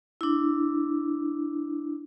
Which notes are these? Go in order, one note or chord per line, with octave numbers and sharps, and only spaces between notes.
D4 E4